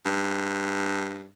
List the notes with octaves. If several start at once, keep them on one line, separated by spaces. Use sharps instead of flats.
G2